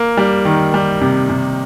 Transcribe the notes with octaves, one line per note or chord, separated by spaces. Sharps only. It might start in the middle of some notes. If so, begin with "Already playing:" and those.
Already playing: A#3
G3
D#3
G3
C3
C3